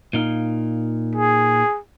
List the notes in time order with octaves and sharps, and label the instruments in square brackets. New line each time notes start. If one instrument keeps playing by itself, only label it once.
[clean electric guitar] A#2 D#4 F5
[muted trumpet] G#4